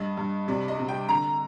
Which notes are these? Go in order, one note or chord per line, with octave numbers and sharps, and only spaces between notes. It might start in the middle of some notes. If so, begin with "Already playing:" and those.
Already playing: G2 D#5
G2
C3 D5
D#5
C3
G5
D3 A#5